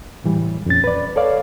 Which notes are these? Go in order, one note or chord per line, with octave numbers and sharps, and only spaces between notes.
A2 E3 G3
F2 A#2 C#4 A6
B4 D5
A4 B4 C#5 D5 F5